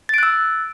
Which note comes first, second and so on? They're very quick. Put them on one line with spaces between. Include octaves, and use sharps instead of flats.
A6 D7 F#6 E6